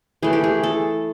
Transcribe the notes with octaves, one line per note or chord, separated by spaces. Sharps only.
E3 A3 G#4
G4
G#4
A4